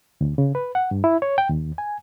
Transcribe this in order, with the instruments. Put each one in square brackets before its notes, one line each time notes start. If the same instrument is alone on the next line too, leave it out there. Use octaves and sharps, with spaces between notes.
[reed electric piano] D2
C#3
B4
F#5
G2
E4
C#5
G5
D#2
G#5